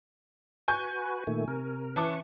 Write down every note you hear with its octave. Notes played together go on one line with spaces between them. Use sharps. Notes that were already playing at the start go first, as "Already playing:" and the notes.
F#4 B4 G#5 C#6 G6
A#2 D#3 A3
C3 A#4
E3 C#4 B4 A5 C#6 D6